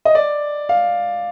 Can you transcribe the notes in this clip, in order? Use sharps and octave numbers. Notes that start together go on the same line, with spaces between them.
D#5
D5
F5